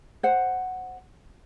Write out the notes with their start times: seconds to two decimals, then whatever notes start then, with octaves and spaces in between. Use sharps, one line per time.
0.23 C5 F#5